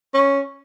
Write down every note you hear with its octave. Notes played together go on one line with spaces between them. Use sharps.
C#4